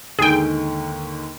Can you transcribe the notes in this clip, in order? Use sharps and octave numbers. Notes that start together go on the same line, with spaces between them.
D#2 G#2 D3 G#4 G5